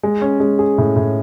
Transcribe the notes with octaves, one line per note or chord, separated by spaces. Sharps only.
G#3
C#4
G#3
G#4
A2
A2